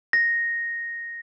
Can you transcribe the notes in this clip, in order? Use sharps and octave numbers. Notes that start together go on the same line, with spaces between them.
A#6